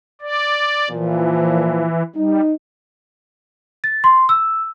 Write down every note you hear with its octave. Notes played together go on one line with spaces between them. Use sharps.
D5
A#2 E3 F3
G3 D#4
A6
C6
E6